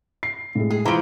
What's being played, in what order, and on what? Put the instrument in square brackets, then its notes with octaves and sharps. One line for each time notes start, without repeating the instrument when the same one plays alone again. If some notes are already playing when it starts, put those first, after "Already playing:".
[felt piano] C7
A2 G#3
[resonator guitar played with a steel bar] G#4
[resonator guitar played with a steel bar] E3 F3 [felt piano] A#5 D7